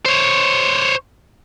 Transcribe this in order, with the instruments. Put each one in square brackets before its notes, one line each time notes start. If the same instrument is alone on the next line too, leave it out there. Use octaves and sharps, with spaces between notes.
[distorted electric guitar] C5 C#5